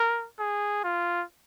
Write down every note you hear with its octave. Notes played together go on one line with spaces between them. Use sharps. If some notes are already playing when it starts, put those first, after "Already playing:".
Already playing: A#4
G#4
F4